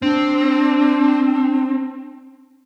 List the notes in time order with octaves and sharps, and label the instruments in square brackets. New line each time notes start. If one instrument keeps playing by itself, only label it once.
[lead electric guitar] C4 [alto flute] D4